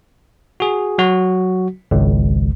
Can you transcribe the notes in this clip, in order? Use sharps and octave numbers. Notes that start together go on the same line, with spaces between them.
F#4 G#4
F#3 F#4
G#1 C#2